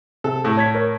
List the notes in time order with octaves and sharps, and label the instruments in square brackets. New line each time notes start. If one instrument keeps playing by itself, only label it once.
[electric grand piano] C3 [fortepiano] A4
[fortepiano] A2
[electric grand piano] C#5 G#6 B6
A#4 C#5